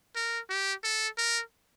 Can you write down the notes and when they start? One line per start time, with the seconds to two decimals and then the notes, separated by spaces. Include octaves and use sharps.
0.16 A#4
0.50 G4
0.84 A4
1.18 A#4